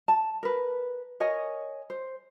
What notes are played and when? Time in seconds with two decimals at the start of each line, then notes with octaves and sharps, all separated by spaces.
0.08 A5
0.43 A#4 B4
1.20 A#4 C#5 D#5 G#5
1.90 C5